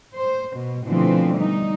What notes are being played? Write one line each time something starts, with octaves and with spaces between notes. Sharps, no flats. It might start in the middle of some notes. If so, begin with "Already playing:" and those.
C5
B2
B2 D3 E3 F3 A3 C4
G3 D#4